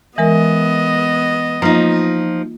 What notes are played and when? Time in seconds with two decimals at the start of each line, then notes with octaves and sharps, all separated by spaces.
0.18 E3 G#3 B3 A#4 D#5
1.62 F3 A#3 D#4 F4